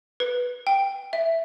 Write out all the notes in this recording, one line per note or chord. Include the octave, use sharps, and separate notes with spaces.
B4
G5
E5